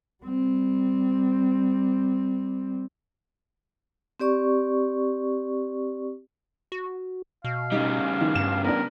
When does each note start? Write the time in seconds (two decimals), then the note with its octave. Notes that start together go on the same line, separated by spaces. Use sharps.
0.24 G3 C4
4.20 C4 G4 D5 C#6
6.72 F#4
7.44 B2 F5
7.72 C#3 G3 D#4
8.21 D#3
8.35 G2 E7
8.65 B3 D4 A#4